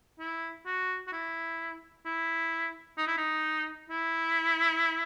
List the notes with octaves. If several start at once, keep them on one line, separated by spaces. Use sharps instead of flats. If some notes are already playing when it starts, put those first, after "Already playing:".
E4
F#4
F#4
E4
E4
D#4
E4
D#4
E4